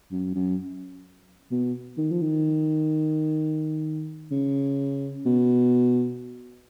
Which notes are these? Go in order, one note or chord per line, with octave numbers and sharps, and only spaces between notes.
F#2
F#2
B2
D#3
F3
D#3
C#3
B2